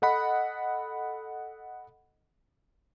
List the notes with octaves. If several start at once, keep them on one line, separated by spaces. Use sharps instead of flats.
A4 D#5 F#5 B5